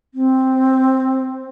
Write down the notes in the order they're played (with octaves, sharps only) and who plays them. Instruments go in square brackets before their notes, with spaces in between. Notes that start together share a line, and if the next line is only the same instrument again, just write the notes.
[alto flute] C4